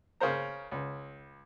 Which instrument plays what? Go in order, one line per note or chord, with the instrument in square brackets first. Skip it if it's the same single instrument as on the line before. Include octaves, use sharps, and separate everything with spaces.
[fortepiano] C#3 A#4 C5 A#5
C#2